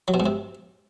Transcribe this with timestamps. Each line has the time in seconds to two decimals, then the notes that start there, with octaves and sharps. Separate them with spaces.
0.08 F#3
0.14 B2
0.20 G#2
0.26 C3